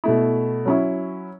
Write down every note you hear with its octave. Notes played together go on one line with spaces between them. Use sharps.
B2 A3 E4
F#3 C#4 E4